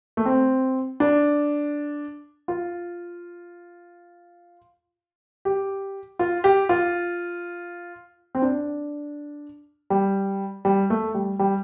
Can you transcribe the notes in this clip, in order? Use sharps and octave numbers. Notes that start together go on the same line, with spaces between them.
A3
C4
D4
F4
G4
F4
G4
F4
C4
D4
G3
G3
A3
G3
G3